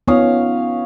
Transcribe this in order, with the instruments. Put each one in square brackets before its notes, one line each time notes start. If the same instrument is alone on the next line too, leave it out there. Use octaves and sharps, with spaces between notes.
[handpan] B3 D#4 F4 [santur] C#4 F5 D#6